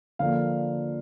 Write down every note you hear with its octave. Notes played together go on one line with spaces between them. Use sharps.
D3 F3 A#3 D4 F5